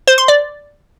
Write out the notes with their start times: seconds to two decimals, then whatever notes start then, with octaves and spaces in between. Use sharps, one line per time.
0.07 C5
0.18 C6
0.28 D5